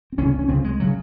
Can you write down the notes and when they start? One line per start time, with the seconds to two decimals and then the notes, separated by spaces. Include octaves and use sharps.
0.12 C4
0.18 C#2 C#3 C#4
0.39 C#4
0.48 C#2 C#3 C4
0.64 G#3
0.80 C#3 F#3